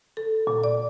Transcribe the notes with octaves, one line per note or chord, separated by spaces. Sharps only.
A4
A#2
D5